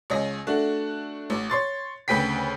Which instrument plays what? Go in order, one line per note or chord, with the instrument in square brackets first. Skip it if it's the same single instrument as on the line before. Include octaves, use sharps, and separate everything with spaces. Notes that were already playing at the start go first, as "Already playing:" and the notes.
[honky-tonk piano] C#2 C#4 D#5 A#6
A3 D4 F#4
A1
C#5 C6 A6
D2 C#3 B4 G5 B6